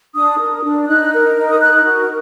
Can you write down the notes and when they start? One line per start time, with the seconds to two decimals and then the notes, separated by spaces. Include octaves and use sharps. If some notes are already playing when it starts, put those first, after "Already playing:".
0.15 D4 D#6
0.39 A#4
0.64 D4
0.87 D#4 F#6
1.12 A#4
1.36 D#4
1.49 D#6
1.60 A#4 F#6
1.84 F#4